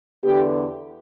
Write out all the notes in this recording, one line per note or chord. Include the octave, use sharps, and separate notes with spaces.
E2 D3 B3 G4